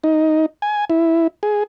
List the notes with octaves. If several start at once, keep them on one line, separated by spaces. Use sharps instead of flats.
D#4
G#5
E4
G#4